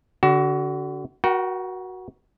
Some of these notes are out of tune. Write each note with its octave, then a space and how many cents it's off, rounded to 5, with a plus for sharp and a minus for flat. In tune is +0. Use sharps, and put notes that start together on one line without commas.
D3 -25 F#4 +25
F#4 +0 A#4 +35 G5 -45